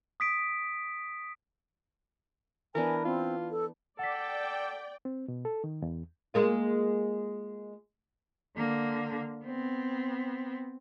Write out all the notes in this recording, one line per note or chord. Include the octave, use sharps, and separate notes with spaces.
D#6 B6 D7
E3 B3 D4 A#4 G#5
C4 F4
A4
A4 D5 F#5 G5 B6
C4
B2
A4
D#3
E2
G#3 A#3 F4
D3 A#3
B3 C4